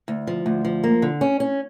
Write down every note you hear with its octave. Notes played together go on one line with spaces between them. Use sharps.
D2
F3
D2
F3
A#3
D3
C#4
C#4